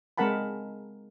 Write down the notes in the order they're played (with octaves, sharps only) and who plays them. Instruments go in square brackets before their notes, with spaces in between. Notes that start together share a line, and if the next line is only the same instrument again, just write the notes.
[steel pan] G#3 C4 A#4 F#5 A5 B5